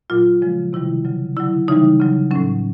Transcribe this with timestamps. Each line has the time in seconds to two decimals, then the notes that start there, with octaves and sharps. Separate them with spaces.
0.10 A#2 F#3 F4
0.42 C#3 F3 G#3
0.73 C3 D#3 G3 E4
1.05 C#3 F#3
1.37 D3 F#3 E4
1.68 C#3 E3 G3 D#4
2.00 C#3 F#3
2.31 A2 F#3 C#4